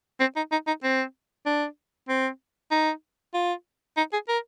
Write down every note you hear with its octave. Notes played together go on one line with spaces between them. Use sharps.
C4
D#4
D#4
D#4
C4
D4
C4
D#4
F4
D#4
G#4
A#4